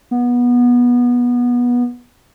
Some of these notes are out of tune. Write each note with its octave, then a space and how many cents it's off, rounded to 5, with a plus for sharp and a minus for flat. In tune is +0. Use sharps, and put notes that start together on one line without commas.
B3 -20